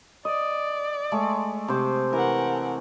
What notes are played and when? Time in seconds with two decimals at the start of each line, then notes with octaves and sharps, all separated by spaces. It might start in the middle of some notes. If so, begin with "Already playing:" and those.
0.25 D5 D#5
1.12 G#3 A3
1.68 C3 C5 D6
2.13 E3 A#4 F#5